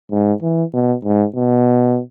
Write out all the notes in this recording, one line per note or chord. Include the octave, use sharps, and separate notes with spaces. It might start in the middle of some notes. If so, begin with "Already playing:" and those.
G#2
E3
B2
G#2
B2